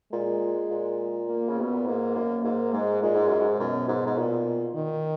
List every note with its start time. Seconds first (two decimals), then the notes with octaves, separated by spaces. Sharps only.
0.12 A#2 G#3
0.71 A#2
1.29 A#3
1.49 C#3
1.58 B2 B3
1.74 A#2
1.86 G#2 A#3
2.15 F#2
2.44 G#2 A#3
2.73 G#2 G#3
3.02 A#2 G#3
3.15 G#2
3.27 F#2
3.41 G#2
3.60 F#2 B2
3.88 G#2
4.06 G#2
4.17 A#2
4.75 D#3